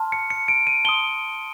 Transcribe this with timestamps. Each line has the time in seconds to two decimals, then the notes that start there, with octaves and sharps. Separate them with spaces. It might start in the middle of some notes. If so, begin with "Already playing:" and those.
Already playing: A5 C6 F6
0.12 C#7
0.30 C#7
0.48 D7
0.67 D#7
0.85 A5 C6 D#6 G7